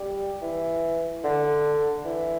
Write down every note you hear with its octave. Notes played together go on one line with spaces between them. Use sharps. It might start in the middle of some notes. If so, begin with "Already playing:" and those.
Already playing: G3
E3
D3
E3